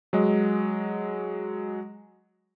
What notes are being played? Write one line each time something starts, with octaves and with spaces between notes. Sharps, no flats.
F#3 G#3 D#5